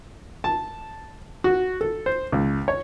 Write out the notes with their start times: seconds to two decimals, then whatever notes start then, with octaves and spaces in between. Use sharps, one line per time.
0.44 A5
1.44 F#4
1.81 A4
2.06 C5
2.32 C#2
2.68 C#5